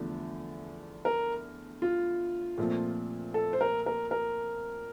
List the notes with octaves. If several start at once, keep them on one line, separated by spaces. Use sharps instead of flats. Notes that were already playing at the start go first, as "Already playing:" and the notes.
Already playing: E2 D3 F3 A3
A#4
F4
A#2 F3 A3 C4
A4
C5
A#4
A#4
A#4